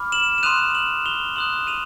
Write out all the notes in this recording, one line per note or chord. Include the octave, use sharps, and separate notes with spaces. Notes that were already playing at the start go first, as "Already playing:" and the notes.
Already playing: B5 D6 F6
E7 F#7
E7
C6 D#6 F#6 D#7 F7
E7 F#7
F7 G7
C6 D#6 F#6 E7 F#7
D#7 F7